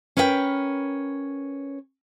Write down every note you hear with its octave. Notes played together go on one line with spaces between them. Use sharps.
C#4 A#4 B4 D5 G5